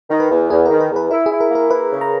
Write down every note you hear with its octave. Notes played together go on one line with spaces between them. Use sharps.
D#3
B4
E2
E2 G#4
A#4
D#3
B4
E2
B4
E4 A#4
G#4
E4
A#4
A#3 A#4
E4 B4
C#3
A#5